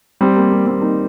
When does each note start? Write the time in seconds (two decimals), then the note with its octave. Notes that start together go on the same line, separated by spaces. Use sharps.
0.21 G3 C4
0.36 A#3
0.51 A#3
0.66 G3 C4
0.81 A#3 D#4